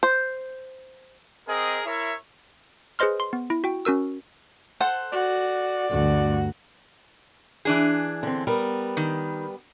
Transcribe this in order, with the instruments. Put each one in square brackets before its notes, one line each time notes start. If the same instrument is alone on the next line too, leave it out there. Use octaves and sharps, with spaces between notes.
[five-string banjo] C5
[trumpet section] C4 G#4 A#4 D#5
E4 A#4 C#5 E5
[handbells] G#4 B4 C5 D#5 C6 F6
C6
B3
E4
F#4 G5
C#4 F#4 A#4 E6
[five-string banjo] A4 C5 F#5
[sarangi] F#4 [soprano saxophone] D5
[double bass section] D2 G2 [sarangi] F#4
[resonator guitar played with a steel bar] E3 D4 G#4
[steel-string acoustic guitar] D3 C4
G3 B3 A#4
[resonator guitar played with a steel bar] D#3